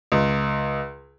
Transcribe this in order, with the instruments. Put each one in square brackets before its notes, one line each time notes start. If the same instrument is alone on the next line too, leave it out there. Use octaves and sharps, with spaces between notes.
[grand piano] C#2